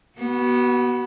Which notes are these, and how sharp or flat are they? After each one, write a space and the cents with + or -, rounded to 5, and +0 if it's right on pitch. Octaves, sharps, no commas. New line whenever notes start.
B3 -20 F#4 +30